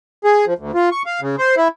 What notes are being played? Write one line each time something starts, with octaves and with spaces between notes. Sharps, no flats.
G#4
F3
D2
F4
C#6
F5
C#3
C5
E4